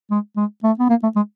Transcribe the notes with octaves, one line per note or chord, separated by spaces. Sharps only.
G#3
G#3
A3
B3
A#3
A3
G#3